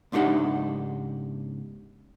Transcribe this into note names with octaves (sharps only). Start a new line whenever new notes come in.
C#2 G#2 D4 D#4 G4 F#5